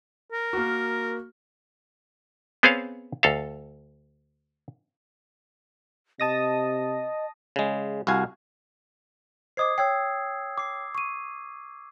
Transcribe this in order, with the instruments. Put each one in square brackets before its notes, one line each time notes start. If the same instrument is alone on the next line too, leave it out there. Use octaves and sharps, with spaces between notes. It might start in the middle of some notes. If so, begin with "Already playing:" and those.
[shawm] A#4
[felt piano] A#3 F#4
[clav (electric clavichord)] B3 C4 G#4 C5 C#5 F5
D2 A4 F5
[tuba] C3 [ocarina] D#5 [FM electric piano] A5 D#6 A#6
[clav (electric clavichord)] C#3 G#3
C2 F#4 F5 G#5
[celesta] C5 D#5 D6 [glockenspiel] D#6 G#6 C7
[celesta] C#5 G5 [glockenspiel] E6 G#6 C7
[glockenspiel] D6 C7
[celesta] C#6 D#7